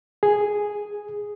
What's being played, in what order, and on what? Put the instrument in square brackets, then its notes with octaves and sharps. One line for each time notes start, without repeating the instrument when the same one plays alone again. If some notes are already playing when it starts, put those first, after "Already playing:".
[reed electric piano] G#4